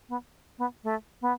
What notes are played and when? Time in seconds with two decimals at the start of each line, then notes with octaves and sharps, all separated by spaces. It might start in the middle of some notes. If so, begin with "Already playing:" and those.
0.09 B3
0.58 B3
0.84 A3
1.21 B3